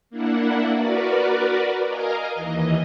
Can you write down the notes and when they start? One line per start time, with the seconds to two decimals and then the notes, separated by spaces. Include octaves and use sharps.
0.10 A#3 D4 E4 F#5
0.73 F#4 A#4 B4 D5
1.87 A#4 D#5 F5 G#5 A#5
2.33 D#2 E3 D#5